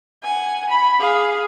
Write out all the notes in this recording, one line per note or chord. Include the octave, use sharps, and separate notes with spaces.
F#5 G#5
B5
G#4 F5